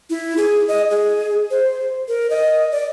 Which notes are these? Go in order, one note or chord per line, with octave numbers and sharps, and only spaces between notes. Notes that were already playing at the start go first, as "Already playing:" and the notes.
E4
G#4
D#5
G#4
C5
A#4
D#5
D5